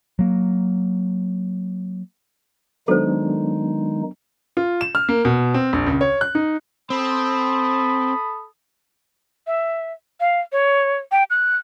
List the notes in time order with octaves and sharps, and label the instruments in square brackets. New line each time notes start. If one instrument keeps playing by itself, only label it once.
[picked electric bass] F#3 A#3
[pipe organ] D#3 G#3 D#4 [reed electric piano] F#3 B3 D4 [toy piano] A4 C5
[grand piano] F4
E7
F6
A#3
B2
C4
A#1
C#2
C#5
F#6
D#4
[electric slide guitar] C4 [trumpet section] A4 B5 D#6
[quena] E5
F5
C#5
G5
F#6